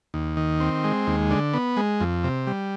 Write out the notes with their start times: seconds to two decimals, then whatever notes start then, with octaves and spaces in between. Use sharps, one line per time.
0.14 D#2
0.37 D#3
0.60 C4
0.84 G#3
1.07 D#2
1.31 D3
1.54 B3
1.77 G#3
2.00 F2
2.24 C3
2.47 G3